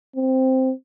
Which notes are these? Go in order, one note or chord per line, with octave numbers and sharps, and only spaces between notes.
C4